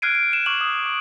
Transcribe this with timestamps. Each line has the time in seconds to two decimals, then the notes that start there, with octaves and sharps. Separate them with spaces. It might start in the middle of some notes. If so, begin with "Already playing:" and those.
0.02 F6 F#6 G#6 C7 D7 D#7
0.15 D7
0.31 C7 D#7 E7
0.46 C#6 D6 F6 F#7
0.61 D#6
0.86 D6